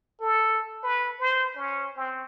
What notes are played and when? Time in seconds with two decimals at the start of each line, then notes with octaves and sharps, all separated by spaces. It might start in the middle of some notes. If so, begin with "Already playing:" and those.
0.21 A4
0.83 B4
1.20 C5
1.56 C#4
1.96 C4